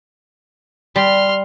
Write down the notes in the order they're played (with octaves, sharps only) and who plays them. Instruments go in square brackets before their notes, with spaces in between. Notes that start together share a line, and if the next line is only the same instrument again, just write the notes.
[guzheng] G3 [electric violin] C6 F6